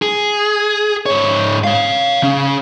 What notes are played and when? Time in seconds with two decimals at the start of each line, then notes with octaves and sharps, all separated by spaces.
0.02 G#4
1.06 G#2 C#5
1.64 C#5 F5
2.22 C#3 C#4